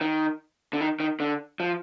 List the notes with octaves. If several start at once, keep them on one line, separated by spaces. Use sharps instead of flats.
D#3
D3
D#3
D#3
D3
F3